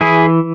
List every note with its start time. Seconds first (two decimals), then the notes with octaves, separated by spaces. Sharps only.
0.01 E3 E4 G#4